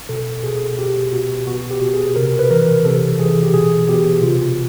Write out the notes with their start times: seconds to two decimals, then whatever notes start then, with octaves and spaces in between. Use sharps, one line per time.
0.09 B2 A4
0.43 B2 G#4
0.79 B2 G4
1.12 B2 F#4
1.47 B2 F#4
1.71 G4
1.82 B2
1.94 G#4
2.16 C3 A#4
2.39 B4
2.50 E3 A#4
2.85 C3 A4
3.20 E3 G#4
3.43 G4
3.53 B2 G#4
3.89 B2 G4
4.22 C3 F4